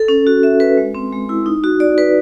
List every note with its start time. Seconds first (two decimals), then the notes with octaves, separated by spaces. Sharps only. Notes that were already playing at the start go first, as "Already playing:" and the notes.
Already playing: A4
0.08 C#4
0.27 F#4
0.43 E5
0.60 B4
0.77 G#3
0.95 C4
1.12 G#3
1.29 E4
1.46 D#4
1.64 F#4
1.80 D5
1.98 B4